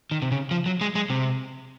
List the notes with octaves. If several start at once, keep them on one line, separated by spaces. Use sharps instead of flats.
D#3
C3
C#3
F3
F#3
G#3
G#3
C3